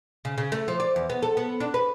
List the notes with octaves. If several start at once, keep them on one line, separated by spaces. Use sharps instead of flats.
C#3
C#3
A3
F3
D5
E2
B3
A4
B3
D4
B4